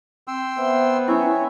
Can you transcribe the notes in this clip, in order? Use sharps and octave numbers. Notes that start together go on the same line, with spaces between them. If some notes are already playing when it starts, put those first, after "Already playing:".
C4 G5 C6 E6
B3 C5 E5
C#4 E4 C#5 E5 G5 G#5 B5